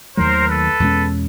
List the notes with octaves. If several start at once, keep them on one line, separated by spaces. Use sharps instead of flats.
D#2 D#3 F#3 A3 A#4 C5
A4 B4
E2 B2 G#3 C#4